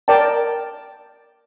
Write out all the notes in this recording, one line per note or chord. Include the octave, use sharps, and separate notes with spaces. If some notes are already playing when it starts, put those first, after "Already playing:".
A#4 D5 G5 A5